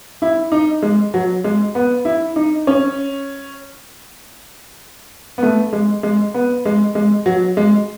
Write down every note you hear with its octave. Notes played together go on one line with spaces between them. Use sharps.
E4
D#4
G#3
F#3
G#3
B3
E4
D#4
C#4
B3
A3
G#3
G#3
B3
G#3
G#3
F#3
G#3